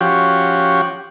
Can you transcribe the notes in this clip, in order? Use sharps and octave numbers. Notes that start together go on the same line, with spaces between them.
F3 C#4 F#4 G4